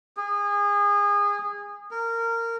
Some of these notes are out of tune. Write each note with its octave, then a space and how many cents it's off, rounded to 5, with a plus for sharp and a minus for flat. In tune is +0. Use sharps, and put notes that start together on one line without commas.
G#4 -30
A#4 -20